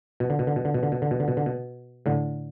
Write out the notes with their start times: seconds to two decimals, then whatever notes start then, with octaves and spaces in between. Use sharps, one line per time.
0.20 B2
0.30 D3
0.39 B2
0.47 D3
0.56 B2
0.65 D3
0.74 B2
0.83 D3
0.92 B2
1.02 D3
1.11 B2
1.20 D3
1.28 B2
1.37 D3
1.46 B2
2.06 A2 D3